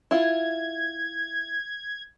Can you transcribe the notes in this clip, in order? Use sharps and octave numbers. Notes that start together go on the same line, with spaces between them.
E4 F4 G#6